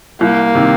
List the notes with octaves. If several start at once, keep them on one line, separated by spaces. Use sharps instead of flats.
C2 A#3
C3 D#3